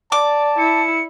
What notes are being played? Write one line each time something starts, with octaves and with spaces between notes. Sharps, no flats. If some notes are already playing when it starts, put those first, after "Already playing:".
D5 A5 D6
E4 C#7